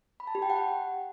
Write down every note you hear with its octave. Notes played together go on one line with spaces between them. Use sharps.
B5
A5
G4
G5
F#5